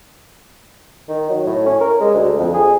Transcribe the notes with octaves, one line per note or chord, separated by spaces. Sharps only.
D#3
F#3
A2
C#4
A#4
G#3
D2
F2
G#4